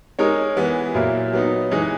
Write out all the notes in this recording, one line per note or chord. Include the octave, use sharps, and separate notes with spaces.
G#3 D#4 A#4 C#5
E3 G#3 B3
A#2 F#3 A#3 E4
F#3 B3 D#4
E3 G#3 D#4